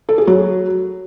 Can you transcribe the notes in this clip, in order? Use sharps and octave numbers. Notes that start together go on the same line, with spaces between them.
A4
G#4
F#3